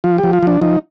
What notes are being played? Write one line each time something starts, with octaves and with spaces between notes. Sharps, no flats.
F3 F4
G4
F3
F4
F3 D4
F3 D#4